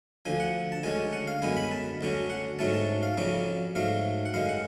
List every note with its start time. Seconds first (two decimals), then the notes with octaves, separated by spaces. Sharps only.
0.25 D2 D3 F3 G#5
0.40 F#5
0.72 A5
0.83 D2 D3 G#3 C#4 G#5
1.13 F#5
1.27 F5
1.42 F#2 D3 G#3 B3 G#5
1.57 B5
1.71 A5
2.01 D2 D3 F#3 C#4
2.30 F#5
2.59 G#2 F#3 A3 C#4 A5
2.73 A5
3.03 F5
3.17 F2 C#3 F#3 C#4 D5
3.75 G#2 F#3 A3 F5
4.26 F#5
4.34 F#2 D3 G#3 F5
4.49 F#5